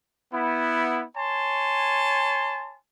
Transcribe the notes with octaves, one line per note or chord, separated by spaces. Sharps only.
B3 E4
C#5 G#5 A5 C6